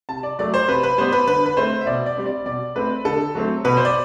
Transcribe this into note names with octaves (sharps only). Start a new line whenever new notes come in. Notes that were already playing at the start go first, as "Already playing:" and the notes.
C3 A5
D5
F#3 A3 D5
C5
C3 B4
B4
G3 B3 C5
B4
D3 B4
B4
A3 C4 C5
E5
B2 D5
D5
G3 C4
D5
B2 D5
A3 C4 B4
D3 A4
F#3 A3 C4
B2 B4
C5
D5